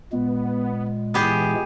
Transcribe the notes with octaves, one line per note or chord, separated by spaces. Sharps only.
A#2 G#3 B3
E3 B3 G4 G#4